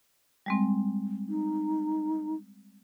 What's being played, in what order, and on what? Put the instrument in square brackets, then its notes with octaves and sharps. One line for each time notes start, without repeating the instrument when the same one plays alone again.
[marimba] G3 G#3 C4
[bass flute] D#4